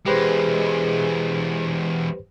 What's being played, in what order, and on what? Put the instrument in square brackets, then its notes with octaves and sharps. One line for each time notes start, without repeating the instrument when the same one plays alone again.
[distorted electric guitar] E2 G#3 [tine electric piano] G4 B4 C5 [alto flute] G#4